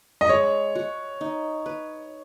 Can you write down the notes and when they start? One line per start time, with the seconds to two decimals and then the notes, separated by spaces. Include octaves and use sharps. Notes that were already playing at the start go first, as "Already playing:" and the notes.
0.21 D#5
0.29 G#3 C#5
0.75 F#4
1.21 D#4
1.66 B4